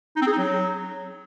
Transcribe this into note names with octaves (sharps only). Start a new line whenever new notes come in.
D#4
C4
G#4
D#4
F#3